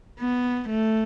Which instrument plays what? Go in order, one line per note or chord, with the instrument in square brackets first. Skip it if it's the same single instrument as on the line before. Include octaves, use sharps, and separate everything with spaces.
[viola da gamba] B3
A3